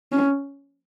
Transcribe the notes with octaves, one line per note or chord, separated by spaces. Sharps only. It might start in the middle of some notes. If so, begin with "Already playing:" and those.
C#4